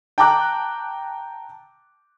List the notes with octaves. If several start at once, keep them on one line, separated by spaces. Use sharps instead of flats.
G5 A5 A#5 D6 F#6